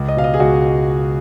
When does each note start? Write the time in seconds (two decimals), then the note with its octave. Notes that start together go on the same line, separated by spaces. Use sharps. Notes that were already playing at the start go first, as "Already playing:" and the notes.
Already playing: C#2
0.08 D#5
0.17 B2 F5
0.24 D#5
0.34 G#4
0.40 C#2 F#4